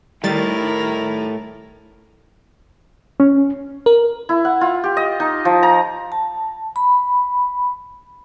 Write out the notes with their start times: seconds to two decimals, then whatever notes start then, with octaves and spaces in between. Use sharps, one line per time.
0.24 A2 D#3 G3 E4 A#4 A6
3.20 C#4
3.86 A#4
4.29 E4
4.45 F#5
4.61 F4
4.84 G4
4.97 D#5
5.20 D#4
5.45 F3
5.63 A#5
6.12 A5
6.76 B5